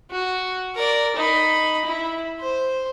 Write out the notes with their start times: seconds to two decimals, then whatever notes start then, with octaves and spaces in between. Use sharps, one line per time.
0.11 F#4
0.75 A#4 D5
1.16 D#4 B5
1.85 E4
2.40 C5